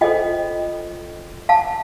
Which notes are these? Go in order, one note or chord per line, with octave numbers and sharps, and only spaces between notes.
F4 A4 C5 D#5 G5
F5 A5